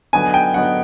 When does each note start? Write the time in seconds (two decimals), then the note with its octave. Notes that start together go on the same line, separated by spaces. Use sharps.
0.13 D3 F#3 B3 D#4 G#5
0.34 G5
0.54 D3 F#3 B3 D#4 F#5